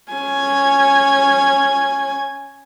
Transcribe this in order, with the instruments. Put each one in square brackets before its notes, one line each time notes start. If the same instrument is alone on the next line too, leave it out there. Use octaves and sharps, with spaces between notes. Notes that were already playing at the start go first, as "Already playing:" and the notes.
[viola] C#4 G#5